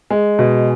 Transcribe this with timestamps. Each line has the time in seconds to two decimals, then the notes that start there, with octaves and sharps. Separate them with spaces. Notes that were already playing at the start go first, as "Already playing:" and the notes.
0.11 G#3
0.39 B2